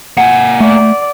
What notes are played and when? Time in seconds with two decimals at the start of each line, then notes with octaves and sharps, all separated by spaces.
0.17 A#3 F#5 G#5
0.60 A3 D5